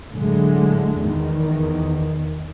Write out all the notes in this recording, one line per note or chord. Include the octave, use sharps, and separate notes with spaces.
A2 D3 F#3 G#3 A3
E2 D#3